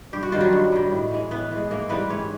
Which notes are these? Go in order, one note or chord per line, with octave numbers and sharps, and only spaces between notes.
G2 G4
F#4
D#3 G3 F4
F#3 F#4
G2
D#3 G3
A2
E3 G#3
A2 B3 B4
E3 G#3
G#2 A#3 A#4
E3 G3 B3 C4 B4
G#2 C#4 C#5